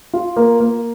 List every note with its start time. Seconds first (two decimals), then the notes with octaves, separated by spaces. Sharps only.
0.13 F4
0.36 A#3
0.60 A#3